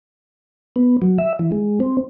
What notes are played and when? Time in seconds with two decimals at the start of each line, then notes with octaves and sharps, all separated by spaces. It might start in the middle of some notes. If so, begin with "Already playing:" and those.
0.76 B3
1.02 F#3
1.18 E5
1.39 E3
1.52 G#3
1.80 C4